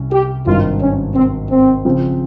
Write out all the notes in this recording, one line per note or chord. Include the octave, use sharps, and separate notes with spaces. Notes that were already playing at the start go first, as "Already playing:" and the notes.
Already playing: C2 C#4
G4
G#1 G2 D#3 F4
C#4
C4
C4
C#3 F3 C4